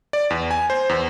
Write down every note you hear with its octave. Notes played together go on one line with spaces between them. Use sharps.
D5
E2
G#5
C5
E2